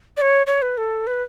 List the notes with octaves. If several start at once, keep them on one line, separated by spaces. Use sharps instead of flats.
D5
C#5
C#5
B4
A4
B4